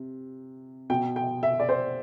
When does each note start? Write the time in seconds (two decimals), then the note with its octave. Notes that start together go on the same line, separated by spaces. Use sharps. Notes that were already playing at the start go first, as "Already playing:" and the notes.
Already playing: C3
0.90 B2 G5
1.16 G5
1.43 E5
1.60 D5
1.69 C5